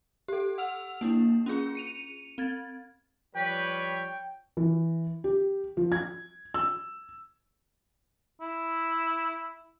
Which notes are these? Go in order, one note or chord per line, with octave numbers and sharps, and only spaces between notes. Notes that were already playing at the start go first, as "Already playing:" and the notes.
G4 A4
F#5 E6 F6 F7
A#3 D4 E4
C#4 F4 G#4
C#7 D#7 F7
C4 G#6 A6
F3 G3 B4 C#5 G5
E3
G4
F3
G#6
E6
E4